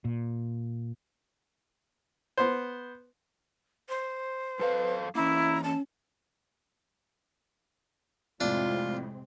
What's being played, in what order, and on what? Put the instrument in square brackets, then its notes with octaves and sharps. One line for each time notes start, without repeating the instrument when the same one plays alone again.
[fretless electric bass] A#2
[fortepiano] B3 C5
[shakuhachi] C5
[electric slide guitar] F#2 A4 F5 [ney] B4
[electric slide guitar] E3 A#3 [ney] C#4 [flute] E4 [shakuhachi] A#5
[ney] C#4 [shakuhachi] A5
[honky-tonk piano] F2 A2 [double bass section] C3 G#3 C4 [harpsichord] D4 [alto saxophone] F4